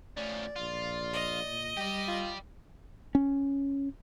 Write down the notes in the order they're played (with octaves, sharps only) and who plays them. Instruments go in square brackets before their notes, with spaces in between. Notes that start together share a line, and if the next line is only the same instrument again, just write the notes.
[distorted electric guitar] F3 C#4 [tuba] A3 [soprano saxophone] D5
[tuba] A#1 [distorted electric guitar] F4
[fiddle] D#5
[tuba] A#2
[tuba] G3 [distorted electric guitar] G4 D5
[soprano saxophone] F4
[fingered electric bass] C#4